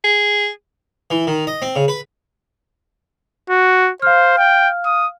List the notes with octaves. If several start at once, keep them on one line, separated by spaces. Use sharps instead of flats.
G#4
E3
D#3
D#5
C4
C#3
B4
F#4
C5 F5 F6
G5
D#6